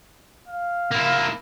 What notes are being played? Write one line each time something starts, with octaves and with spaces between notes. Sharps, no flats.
F5
A#3 E4